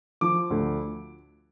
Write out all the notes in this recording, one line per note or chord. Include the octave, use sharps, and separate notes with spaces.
F3 D6
D2